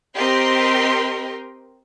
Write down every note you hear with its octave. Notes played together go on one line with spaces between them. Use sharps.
C4 G4 A#4 D#5 G5 C6